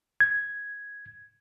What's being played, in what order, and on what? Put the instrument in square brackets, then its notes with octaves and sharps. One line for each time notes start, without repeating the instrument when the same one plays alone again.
[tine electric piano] G#6